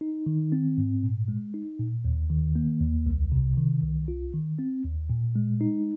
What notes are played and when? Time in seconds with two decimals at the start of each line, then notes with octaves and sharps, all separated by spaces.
0.01 D#4
0.26 D#3
0.52 C4
0.78 G#2
1.03 A#2
1.28 G#3
1.54 D#4
1.79 A#2
2.05 D#2
2.30 D#3
2.56 A#3
2.81 D#2
3.06 C2
3.32 C3
3.57 D#3
3.83 C2
4.08 F4
4.34 D#3
4.59 C4
4.84 D#2
5.10 A#2
5.36 G#3
5.61 D#4